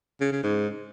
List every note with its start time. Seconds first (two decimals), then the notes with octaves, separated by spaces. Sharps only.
0.21 C#3
0.32 C#3
0.43 G#2